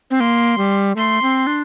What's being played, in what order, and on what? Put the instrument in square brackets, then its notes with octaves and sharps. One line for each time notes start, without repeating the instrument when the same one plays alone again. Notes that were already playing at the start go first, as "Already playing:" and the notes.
[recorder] C4
[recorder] A#3 [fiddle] C6
[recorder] G3
[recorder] A3 [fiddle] C6
[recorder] C4
D4